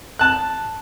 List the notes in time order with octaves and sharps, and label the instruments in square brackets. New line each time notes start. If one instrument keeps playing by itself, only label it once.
[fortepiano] A5 F#6